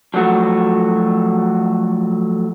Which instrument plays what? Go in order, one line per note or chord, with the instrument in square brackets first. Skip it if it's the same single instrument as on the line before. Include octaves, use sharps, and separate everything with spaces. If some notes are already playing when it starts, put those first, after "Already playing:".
[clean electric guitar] F3 F#3 A3 F#4